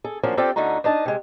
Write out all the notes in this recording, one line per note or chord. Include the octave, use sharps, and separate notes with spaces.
G#4 A4
F3 F#3 A#3 C#4 D4
C4 F4 G4 A4 D5 G5
D2 D3 D#4 E4 F#4 A#5
D4 D#4 D#5 A5
C3 G#3